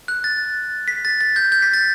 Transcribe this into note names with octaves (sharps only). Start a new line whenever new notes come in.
F#6
A6
B6
A6
A6
G6
G6
B6
A6